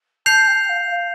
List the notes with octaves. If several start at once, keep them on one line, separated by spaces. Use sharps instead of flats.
A5 G6 C7 F7
G5
F5
F5